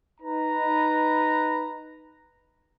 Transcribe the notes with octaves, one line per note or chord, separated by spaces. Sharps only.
D#4 B4 A#5